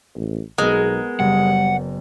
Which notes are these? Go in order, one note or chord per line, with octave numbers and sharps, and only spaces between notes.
A1
B1 G#3 B3 A#4
F#1 G3 F#5